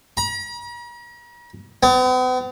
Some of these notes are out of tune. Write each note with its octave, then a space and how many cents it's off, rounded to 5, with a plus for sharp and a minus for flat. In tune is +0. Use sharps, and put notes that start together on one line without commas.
A#5 +45
B3 +45